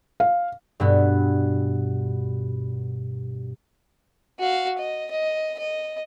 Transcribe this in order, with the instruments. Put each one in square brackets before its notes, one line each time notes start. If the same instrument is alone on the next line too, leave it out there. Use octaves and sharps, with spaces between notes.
[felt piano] F5
[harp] G2 B2 B3
[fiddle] F#4 F5
D#5
D#5
D#5